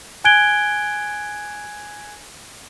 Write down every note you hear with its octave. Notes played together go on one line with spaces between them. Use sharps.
G#5 F#6 G#6 D7 G7